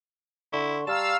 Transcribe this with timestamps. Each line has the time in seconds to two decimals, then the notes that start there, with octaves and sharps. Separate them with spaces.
0.53 D3 E4 C6 C#6
0.87 G3 F5 A5 A#5 E6 F6 E7